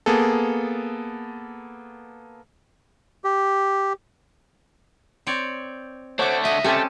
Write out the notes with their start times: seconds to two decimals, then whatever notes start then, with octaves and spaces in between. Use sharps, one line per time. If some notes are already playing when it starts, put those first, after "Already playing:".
0.06 A#3 B3 G#4 A4
3.24 G4
5.27 C4 C#5 D5
6.19 D3 A3 C5 C#5 F#5 D6
6.45 C#2 D#5 E5
6.65 A3 C4 C#4 G4 A4 A5